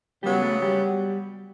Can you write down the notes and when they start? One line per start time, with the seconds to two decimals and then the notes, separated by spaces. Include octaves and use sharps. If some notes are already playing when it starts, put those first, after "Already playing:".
0.23 C#3 F#3 G3 B3 G4
0.42 A3 A4
0.62 G3 G4